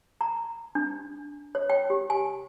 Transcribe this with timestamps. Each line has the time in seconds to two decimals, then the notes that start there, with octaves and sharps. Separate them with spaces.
0.21 A#5
0.75 D4
1.55 C#5
1.70 G5
1.90 G4
2.10 G#5